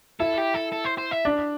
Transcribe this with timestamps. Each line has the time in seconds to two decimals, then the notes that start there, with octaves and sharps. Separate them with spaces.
0.20 E4 A4
0.38 G4
0.54 A4
0.72 A4
0.85 C5
0.98 C5
1.11 E5
1.25 D4